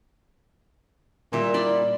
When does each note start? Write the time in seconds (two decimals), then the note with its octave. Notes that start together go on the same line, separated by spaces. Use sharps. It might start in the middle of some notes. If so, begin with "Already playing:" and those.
1.33 A#2 G3 E5
1.54 D5 B5 C6